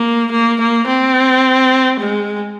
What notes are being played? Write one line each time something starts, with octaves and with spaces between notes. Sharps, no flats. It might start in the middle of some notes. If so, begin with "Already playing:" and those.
Already playing: A#3
A#3
A#3
C4
G#3